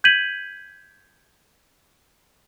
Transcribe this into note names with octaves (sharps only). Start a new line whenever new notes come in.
G6 G#6 B6 D#7 F#7